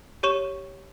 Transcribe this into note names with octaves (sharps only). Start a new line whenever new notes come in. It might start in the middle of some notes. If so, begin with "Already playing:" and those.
G4 C#5 C#6 E7